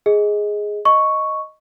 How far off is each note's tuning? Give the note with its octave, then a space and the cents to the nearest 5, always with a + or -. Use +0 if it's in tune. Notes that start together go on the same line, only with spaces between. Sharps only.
G#4 +0 D#5 +15
D#5 +0 C#6 +0